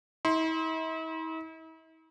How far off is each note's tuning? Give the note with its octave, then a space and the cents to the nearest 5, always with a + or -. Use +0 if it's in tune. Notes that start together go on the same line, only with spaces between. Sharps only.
E4 -45 C6 +5